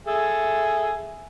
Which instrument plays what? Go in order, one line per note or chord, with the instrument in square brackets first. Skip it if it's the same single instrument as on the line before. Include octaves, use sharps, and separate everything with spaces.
[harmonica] G#4 A4 E5